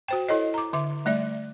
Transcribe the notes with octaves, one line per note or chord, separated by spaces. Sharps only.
F#4 C5 G5
E4 A4 C#5 D#5
A#5 D6
D3 E5 D6
G3 A3 D5 E5